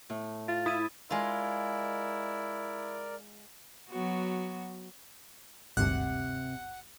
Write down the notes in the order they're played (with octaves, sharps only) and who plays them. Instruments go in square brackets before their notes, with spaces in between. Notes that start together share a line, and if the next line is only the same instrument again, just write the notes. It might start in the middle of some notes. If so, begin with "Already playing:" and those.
[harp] A2
[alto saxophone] F4 [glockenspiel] A6
[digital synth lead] E4 [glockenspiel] D#6 G#6 D#7
[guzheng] G#3 F4 [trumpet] E4 [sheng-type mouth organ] A#4 D5
[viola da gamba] F#3 B3 F#4
[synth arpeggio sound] G#1 D2 G2 [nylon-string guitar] C3 [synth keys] F#5